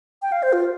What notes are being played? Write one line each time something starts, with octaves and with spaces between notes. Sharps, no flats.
G5
F5
C5
F4